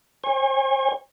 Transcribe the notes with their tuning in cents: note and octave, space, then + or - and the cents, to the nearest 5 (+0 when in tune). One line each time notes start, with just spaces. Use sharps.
C#5 -45 G#5 -35